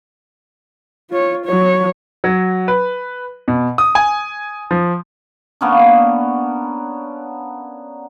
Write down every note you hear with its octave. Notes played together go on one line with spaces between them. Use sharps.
F4 C#5
F#3 C#5
F#3
B4
B2
D#6
G#5
F3
A#3 B3 C#4 D4